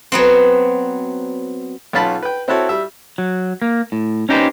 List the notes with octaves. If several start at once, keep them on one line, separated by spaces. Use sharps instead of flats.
F#3 B3 C4
B1 C#4 F4 A5 B5
B4 G5
C4 E4 F#4 A4 C#5
G3 E5
F#3
A#3
A2
C#4 D#4 G4 G#4 B4 C5